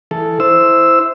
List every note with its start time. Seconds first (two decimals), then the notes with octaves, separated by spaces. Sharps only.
0.11 E3 A4
0.40 E4 C5 E6